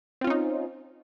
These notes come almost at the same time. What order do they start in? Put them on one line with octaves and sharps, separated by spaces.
C4 F4 C#4 D#4